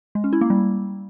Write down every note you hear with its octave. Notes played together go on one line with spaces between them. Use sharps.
G#3
C#4
E4
A#3
G3